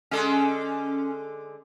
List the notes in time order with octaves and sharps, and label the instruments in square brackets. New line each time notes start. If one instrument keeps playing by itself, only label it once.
[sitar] D3 G#3 A4 [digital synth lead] C#4